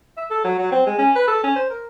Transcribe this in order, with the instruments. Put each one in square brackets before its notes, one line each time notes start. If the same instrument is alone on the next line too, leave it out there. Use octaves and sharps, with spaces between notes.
[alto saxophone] E5
A4
F#3
F#3
C4
G#3
C#4
B4
A4
C#4
C5
A#4